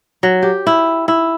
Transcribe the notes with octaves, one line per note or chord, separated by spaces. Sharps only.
F#3
G4
E4
E4